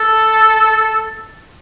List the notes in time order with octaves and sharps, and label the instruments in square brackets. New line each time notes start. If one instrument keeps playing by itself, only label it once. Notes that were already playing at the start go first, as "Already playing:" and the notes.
Already playing: [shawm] A4